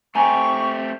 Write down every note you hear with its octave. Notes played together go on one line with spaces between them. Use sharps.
A3 C4 G4 G#5 A#5 C#6